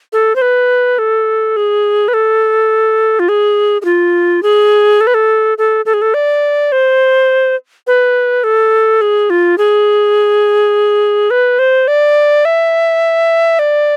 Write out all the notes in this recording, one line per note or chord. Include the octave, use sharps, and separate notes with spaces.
A4
C5
B4
A4
G#4
B4
A4
F4
G#4
G#4
F4
G#4
A4
B4
A4
A4
A4
G#4
A4
D5
C5
B4
A4
G#4
F4
G#4
B4
C5
D5
E5
D5